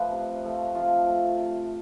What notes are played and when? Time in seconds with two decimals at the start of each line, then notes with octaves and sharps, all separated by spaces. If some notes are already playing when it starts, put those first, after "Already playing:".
Already playing: F3 A3 B4
0.12 C3
0.43 F3 A3
0.74 C3 F3 F4
1.06 F3 A3
1.38 C3